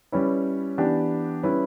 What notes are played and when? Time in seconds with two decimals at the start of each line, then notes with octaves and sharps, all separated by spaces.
0.12 G3 C#4 E4 B4
0.78 E3 B3 D4 G4
1.43 G3 C#4 E4 B4